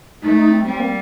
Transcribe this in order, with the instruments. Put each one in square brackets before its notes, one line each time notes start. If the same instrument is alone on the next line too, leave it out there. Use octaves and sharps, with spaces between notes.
[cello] A3 [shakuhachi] D#4
[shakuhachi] D#4
C4
[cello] G3 [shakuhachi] C4
[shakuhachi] A#3